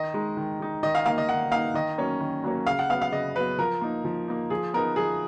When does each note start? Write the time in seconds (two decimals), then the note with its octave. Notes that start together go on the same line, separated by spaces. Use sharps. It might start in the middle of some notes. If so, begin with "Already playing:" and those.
Already playing: D#3 D#5
0.14 G#3 D#4
0.37 D#3
0.60 G#3 D#4
0.83 D#3 D#5
0.95 F5
1.06 A#3 D#4 F5
1.18 D#5
1.29 D#3 F#5
1.51 A#3 D#4 F5
1.74 D#3 D#5
1.98 F#3 A#3 C#4
2.21 D#3
2.44 F#3 A#3 C#4
2.66 C#3 F5
2.79 F#5
2.89 B3 F5
2.93 F#3
3.01 F5
3.12 C#3 D#5
3.35 F#3 B3 B4
3.59 F3 A#4
3.81 A#3 D#4
4.05 F3
4.28 A#3 D#4
4.50 F3 G#4
4.74 B3 D#4 A#4
4.96 F3 G#4